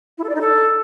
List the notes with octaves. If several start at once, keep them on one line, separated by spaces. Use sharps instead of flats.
E4
A4
D5
D#4
A4